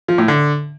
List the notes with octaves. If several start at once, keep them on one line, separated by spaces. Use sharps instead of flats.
F3
A2
D3